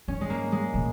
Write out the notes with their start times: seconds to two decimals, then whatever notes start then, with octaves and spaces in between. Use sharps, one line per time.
0.08 G#2 C#4
0.21 G#3
0.30 A#3
0.52 G#3
0.74 A#2